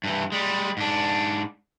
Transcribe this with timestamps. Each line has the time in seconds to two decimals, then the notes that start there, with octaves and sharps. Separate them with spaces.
0.04 G2 E3
0.32 G3 G#3
0.77 G#2 D4